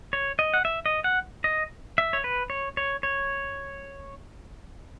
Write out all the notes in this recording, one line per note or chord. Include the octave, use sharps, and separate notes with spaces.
C#5
D#5
F#5
E5
D#5
F#5
D#5
E5
C#5
B4
C#5
C#5
C#5